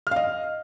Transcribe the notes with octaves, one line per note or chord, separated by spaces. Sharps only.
D#5 F5 F6